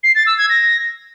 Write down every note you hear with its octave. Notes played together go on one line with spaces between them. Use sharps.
C7
A6
E6
G#6
A#6